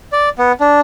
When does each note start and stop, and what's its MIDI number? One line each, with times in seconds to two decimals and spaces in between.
0.12 0.29 74
0.39 0.52 59
0.60 0.81 62